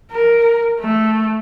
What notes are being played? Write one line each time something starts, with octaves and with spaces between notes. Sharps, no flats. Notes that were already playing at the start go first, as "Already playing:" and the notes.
A#4
A3